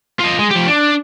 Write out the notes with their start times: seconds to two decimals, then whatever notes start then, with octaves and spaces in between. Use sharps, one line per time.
0.20 F4 D#5
0.39 G#3
0.51 F3 G4
0.67 D4